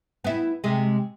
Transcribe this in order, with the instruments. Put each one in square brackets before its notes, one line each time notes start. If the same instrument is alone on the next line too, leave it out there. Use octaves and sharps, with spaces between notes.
[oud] B3 E4
C3 G#3